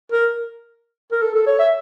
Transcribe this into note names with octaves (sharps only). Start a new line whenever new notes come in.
A#4
A#4
A4
A4
C#5
E5